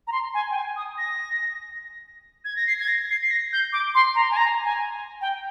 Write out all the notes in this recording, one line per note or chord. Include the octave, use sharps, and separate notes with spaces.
A#5
C6
G#5
G5
G#5
D#6
A#6
G#6
A#6
C7
G#6
A#6
C7
C7
A#6
G6
D6
C6
A#5
G#5
A#5
G#5
G5